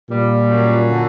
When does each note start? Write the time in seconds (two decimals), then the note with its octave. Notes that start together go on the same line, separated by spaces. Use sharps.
0.10 A#2 G3
0.50 F#2
0.88 D3